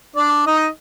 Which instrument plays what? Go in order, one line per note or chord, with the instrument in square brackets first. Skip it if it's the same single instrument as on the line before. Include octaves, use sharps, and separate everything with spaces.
[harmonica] D4 D5
D#4 D#5